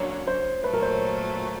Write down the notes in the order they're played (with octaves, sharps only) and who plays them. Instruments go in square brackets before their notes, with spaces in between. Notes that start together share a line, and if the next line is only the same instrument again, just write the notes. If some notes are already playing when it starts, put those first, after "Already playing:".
Already playing: [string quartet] D3 F#3 A#3 C#4 [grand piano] C#5
[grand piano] C5
[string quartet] A#2 F#3 A3 [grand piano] B4
[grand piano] A#4
C5
C#5